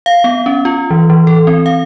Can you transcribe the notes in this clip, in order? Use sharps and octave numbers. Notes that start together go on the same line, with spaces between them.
F5
B3
C#4
F4
E3
E3
A4
C4
F5